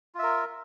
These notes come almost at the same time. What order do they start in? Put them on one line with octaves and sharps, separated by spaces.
F4 E5 A#4